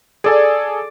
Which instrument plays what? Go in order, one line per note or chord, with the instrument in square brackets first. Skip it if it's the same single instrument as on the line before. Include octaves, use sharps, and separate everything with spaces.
[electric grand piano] G#4 A4 G#5 [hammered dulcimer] D5